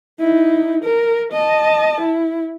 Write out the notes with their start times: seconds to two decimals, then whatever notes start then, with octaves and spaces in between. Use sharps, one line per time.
0.20 D#4 E4
0.84 A#4
1.32 D#5 A5
2.01 E4